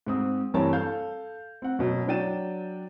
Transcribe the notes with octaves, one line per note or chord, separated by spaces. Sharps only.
G#2 C4 D#6
G2 E3 C4 A#4 C#5 A5
A4 F5 A5 G6
C4 F#5
F#2 B2
F#3 D4 G5 A6 D#7 E7